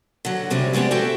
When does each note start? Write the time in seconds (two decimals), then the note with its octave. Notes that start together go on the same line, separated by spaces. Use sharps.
0.25 D3 F#3
0.50 F2 C3 G3 C#4
0.73 F3 G3 G#3 B3 G4
0.91 F#4 G4 A4 E5 G5